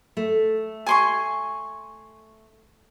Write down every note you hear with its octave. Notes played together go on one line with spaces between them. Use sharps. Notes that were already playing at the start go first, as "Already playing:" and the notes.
A3
G#5 C6 C#6